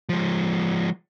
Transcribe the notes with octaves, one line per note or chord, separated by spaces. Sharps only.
F3 G#3